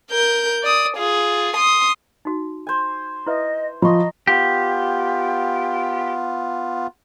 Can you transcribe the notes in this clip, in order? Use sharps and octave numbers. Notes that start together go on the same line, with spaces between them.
A#4 G6
D5 D#6
F4 G#4
C6 D#6
D#4 F#4
C5 G#5
E4 B4 D#5 E5
F3 F4 D#5 A#5 C6 C#6
B3 F4 G4